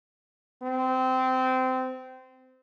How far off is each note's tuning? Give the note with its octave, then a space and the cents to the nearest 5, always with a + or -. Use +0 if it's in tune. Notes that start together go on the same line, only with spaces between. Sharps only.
C4 -20